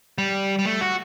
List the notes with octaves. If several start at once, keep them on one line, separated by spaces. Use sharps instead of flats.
G3
G3
A3
F#4